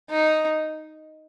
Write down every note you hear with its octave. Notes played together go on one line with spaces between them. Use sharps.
D#4